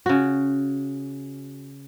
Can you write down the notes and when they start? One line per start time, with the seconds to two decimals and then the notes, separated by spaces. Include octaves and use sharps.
0.06 C#3 F#4